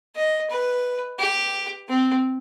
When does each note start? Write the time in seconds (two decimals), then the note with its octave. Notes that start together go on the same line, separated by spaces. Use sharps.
0.16 D#5
0.50 B4
1.19 G4
1.88 C4